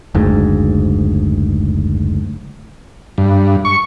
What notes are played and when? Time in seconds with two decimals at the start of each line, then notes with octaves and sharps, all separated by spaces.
0.15 F#1 D2 G#2
3.18 G2
3.65 C#6